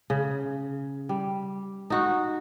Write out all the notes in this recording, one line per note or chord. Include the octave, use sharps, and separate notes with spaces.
C#3
G3
D#4 F#4